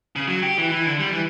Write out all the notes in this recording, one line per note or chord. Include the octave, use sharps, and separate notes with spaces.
C#3
F#3
G4
E3
E3
D3
G3
E3